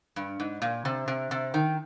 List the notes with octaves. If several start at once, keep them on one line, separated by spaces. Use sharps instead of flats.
G2
G#2
A#2
C3
C3
C3
D#3